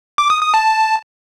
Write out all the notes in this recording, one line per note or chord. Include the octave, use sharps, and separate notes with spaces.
D6
D#6
D#6
A5